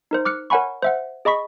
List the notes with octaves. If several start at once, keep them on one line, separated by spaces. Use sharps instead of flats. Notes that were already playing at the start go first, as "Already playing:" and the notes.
D#4 A#4 C5
D6 F6 F#6 C#7
A#4 C#5 F#5 G#5 B5 C#6
C5 E5 F#5
G#4 D#5 B5 C#6 B6